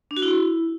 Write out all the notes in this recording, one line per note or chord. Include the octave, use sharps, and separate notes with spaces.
D4
F#4
E4